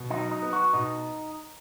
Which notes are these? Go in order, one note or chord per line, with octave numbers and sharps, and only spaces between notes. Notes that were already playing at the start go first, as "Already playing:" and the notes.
Already playing: B2
F#3 D#4
D#4
B3
F#4
B2 D#4